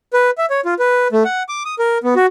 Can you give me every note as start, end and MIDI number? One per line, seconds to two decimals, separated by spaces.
0.13 0.31 71
0.38 0.46 76
0.50 0.61 73
0.65 0.74 65
0.79 1.08 71
1.12 1.23 57
1.25 1.43 78
1.49 1.63 86
1.65 1.75 87
1.79 1.98 70
2.04 2.14 59
2.16 2.26 66